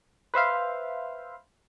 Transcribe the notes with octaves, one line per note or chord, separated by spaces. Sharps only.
B4 C5 E5 F5